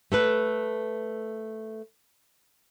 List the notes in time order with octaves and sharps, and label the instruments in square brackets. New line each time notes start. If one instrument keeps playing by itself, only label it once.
[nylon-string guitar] A3 A4 B4